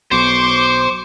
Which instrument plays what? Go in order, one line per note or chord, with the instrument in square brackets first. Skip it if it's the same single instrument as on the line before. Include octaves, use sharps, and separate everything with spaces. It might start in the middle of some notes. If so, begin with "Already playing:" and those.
[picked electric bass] B1 B2 [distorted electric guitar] C5 [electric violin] C#6 D6